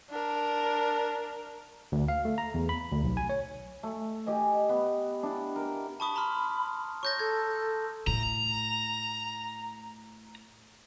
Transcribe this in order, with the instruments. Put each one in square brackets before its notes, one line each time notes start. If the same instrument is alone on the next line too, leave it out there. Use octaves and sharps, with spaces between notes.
[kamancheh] D4 A#4
[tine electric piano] D2
F5
A3
A#5
E2
B5
D2
B1
G#5
C#5
[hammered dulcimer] A3
G4 D#5 G#5
B3
D4 E4
A#4
[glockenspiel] A5 C#6 D#6 [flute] B5
[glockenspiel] A#5 C6 F6
[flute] C#5 [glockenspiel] C#6 G6 A#6
[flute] A4 [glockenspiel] G#6
[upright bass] A2 A3 [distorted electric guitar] A#5